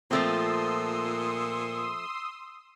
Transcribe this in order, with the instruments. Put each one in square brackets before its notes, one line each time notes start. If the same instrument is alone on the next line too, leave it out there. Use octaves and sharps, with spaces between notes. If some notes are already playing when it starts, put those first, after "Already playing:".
[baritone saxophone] A#2 [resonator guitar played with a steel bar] F3 A3 C4 [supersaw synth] C6 D#6 E6